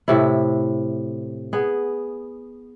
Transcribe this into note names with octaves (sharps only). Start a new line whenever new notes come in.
A2 C3 E4
B3 G#4